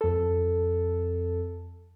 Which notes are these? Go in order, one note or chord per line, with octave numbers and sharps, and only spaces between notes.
F2 A4